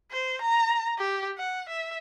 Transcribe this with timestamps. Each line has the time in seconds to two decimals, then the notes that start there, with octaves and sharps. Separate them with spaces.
0.11 C5
0.41 A#5
0.98 G4
1.37 F#5
1.69 E5